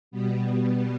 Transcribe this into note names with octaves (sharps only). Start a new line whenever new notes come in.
B2 G3 B3